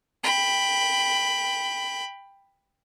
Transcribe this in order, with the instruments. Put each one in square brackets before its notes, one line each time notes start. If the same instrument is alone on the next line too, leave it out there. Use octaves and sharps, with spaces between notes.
[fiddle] G5 B5